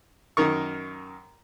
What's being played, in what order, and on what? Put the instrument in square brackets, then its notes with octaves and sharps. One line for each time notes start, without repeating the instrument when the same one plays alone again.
[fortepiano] F#2 D#3 A#4 C#6